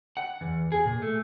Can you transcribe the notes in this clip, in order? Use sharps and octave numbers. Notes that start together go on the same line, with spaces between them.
F#5
E2
G#4
A#2
A3